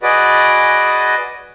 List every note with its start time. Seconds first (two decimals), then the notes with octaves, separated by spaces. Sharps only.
0.03 F#4 G#4 B4 D5 D#5